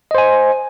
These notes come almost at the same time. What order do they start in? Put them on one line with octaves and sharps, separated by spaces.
D#5 C5 G#5